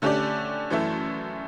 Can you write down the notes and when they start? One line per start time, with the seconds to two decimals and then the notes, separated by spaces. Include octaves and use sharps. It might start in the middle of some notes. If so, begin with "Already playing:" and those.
0.02 D3 A3 C#4 G4 D5
0.70 F#2 E3 A3 E4